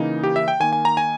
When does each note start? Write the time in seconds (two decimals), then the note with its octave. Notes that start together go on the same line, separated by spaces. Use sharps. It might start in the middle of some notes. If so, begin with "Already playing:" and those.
Already playing: C#3 E3 A#3 D#4
0.24 G4
0.36 E5
0.48 G5
0.60 D#3 A#3 G#5
0.73 G#5
0.85 A#5
0.97 G#5